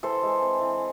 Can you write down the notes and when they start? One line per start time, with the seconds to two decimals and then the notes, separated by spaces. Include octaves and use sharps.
0.03 E3 A4 C5
0.23 G#3
0.42 C4
0.61 E3